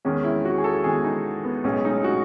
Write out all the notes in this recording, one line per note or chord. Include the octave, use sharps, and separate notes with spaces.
E2 D#3 G#3 C#4
E4
F#4
G#4
A4
E2 D#3 G#3 G#4
D#4
B3
B1 A2 G#3 C#4
D#4
F#4